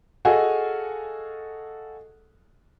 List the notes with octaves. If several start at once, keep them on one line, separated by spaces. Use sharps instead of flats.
F#4 G#4 A4 D#5 F5 G#5